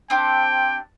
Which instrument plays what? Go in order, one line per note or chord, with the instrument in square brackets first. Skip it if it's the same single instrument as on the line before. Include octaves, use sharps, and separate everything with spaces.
[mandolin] C4 D4 G4 [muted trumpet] G5